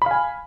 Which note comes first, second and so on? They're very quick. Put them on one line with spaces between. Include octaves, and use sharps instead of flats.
B5 F5 G#5